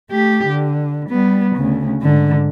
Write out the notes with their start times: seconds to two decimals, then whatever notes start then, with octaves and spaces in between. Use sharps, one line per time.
0.10 A3 G4
0.48 D3
1.10 G3 B3
1.56 D2 C#3
2.02 G#2 D3